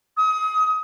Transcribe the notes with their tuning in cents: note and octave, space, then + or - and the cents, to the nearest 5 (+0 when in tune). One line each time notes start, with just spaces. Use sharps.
D#6 +30